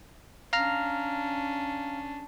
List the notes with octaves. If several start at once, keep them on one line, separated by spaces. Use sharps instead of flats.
C#4 D4 F5 A#5 F6